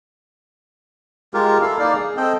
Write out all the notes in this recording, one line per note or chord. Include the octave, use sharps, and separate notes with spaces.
G#3 F4 G4 A#4
E4 A4 A#4 F5
A#3 D#4 D5 F5
G#4
C4 A4 D#5 G5